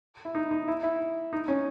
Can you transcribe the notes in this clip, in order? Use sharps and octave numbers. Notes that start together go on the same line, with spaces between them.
E4
D#4
D#4
E4
E4
D#4
C#4